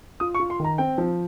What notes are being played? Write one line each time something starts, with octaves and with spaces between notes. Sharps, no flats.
F4 D#6
C#6
F4
C6
D#3 A#5
C4 G5
F3